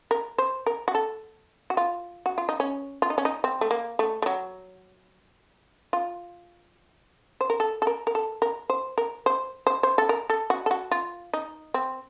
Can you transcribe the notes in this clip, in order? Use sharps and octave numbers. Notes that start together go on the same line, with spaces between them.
A#4
C5
A#4
F#4
A4
F#4
F4
F#4
F4
D#4
C#4
F4
D#4
C#4
D#4
C4
A3
A#3
A3
A3
F#3
F4
C5
A#4
A4
A4
A#4
A#4
A4
A#4
C5
A#4
C5
C5
C5
A4
A#4
A4
F#4
A4
F#4
F4
D#4
C4